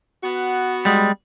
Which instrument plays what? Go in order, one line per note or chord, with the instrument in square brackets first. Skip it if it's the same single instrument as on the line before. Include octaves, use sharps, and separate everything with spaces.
[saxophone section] B3 F#4
[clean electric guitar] G3 G#3